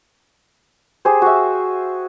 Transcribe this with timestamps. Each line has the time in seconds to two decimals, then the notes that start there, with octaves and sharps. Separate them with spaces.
1.05 G4 G#4 C5
1.22 F#4 E5